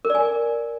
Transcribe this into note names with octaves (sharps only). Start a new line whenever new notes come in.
A#4
D5
G#5